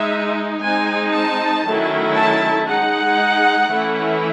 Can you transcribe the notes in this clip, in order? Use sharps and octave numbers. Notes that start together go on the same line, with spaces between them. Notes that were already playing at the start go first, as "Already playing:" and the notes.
Already playing: G#3 D#4 E5
G#3 C4 D#4 G#5
A5
D#3 F#3 A3 C#4 E4
A5
G#3 D#4 F#5
E3 A3 C#4 E4